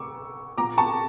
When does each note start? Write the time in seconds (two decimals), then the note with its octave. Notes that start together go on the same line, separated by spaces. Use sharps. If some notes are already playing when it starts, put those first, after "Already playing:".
Already playing: C#6 D6 E6
0.58 A#2 A#5 D6
0.78 A5 C#6